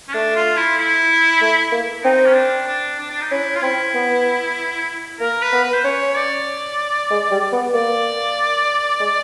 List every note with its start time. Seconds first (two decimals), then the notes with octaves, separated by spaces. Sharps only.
0.08 C#4
0.14 A3 D4
0.35 F4
0.56 E4
0.77 E4
1.41 A3
1.72 A#3
2.04 C4 D#4
2.26 C#4
2.35 D4
2.68 D4
2.99 D4
3.11 D4
3.21 D#4
3.31 C#4 E4
3.55 F4
3.63 C4 E4
3.94 B3
5.20 A#3 A#4
5.42 B4
5.53 B3
5.63 B4
5.74 C5
5.84 C#4 C#5
6.16 D5
7.11 G#3
7.32 G3
7.53 B3
7.74 A#3 D5
9.01 G#3